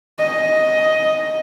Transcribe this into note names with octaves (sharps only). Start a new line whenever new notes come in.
D#5